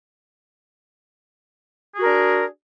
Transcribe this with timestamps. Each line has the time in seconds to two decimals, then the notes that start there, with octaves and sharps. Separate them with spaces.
1.94 G#4
1.97 F#4
2.01 A#4
2.04 D4